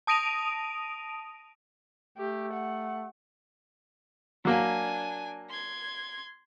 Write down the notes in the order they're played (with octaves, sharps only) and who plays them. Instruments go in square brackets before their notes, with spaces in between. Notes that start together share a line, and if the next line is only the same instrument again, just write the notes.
[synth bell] A5 D#6 A#6 D7 D#7 F7
[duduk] A3 [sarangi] G4
[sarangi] F#5
[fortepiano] F#3 A#3 [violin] D4 G#5
[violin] C6 G#6